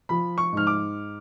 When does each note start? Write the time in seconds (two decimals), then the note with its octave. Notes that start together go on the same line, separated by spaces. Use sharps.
0.09 F3 B5
0.38 C#6
0.53 G#2 F6
0.67 D6